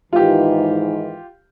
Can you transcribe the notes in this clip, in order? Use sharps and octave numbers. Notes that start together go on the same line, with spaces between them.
G#2 D#3 E3 F4 G4